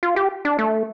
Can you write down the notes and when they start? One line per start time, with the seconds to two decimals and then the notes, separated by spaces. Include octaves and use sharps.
0.03 F4
0.16 G4
0.45 D4
0.58 A3